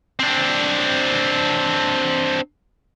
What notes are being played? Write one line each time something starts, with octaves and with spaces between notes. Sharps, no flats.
C4 D4